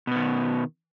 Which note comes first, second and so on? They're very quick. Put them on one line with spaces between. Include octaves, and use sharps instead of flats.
B2 B3 D#3